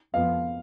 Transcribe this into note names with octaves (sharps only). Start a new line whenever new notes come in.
F2 F3 B3 F5